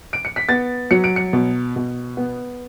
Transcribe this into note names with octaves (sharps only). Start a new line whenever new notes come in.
D7
C#7
B6
B3 A6
F#3 C#7
D7
C#7
B2
B2
B3